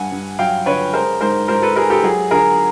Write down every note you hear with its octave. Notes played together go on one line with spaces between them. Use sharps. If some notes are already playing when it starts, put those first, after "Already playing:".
Already playing: G2 F#5 G#5
G2
F#3 F5 G5
D3 B4 C#5
G#3 A#4 C5
G#2 A#4 C5
G#2 A#4 C5
A4 B4
G#3 G#4 A#4
G4 A4
F#3 G#4
D3 G#4 A#4